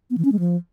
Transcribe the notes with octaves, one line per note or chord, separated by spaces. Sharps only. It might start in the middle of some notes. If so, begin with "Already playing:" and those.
B3
E3
C#4
G#3
F3